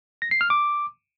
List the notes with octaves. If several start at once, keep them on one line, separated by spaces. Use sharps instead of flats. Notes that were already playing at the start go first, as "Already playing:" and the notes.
A#6
C7
F6
D6